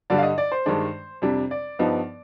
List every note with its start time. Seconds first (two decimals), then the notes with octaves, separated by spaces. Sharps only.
0.10 G2 D3 G3 D5
0.18 F5
0.23 D#5
0.38 D5
0.52 C5
0.66 G2 D#3 G#3 D4
1.22 F2 C3 G3 D4
1.51 D5
1.79 G2 F3 B3 D#4